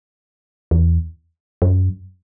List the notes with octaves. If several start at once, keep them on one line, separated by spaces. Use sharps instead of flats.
E2
F#2